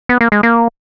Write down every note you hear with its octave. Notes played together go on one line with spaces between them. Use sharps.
B3
A#3
G#3
A#3